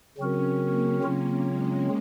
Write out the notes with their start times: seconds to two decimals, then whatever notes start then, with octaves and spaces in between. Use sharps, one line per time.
0.18 C#3 F#3 C4 C#4 F#4 A#4
0.61 A#3
1.03 C#3 F#3 A#3 C4 F4
1.46 G#3